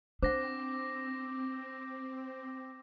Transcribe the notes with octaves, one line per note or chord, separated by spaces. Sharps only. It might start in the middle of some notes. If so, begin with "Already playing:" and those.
C4 D4 C5 F#5 D6 A#6